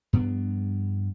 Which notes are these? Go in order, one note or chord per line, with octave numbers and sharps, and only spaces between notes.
G2 F3 B3 D4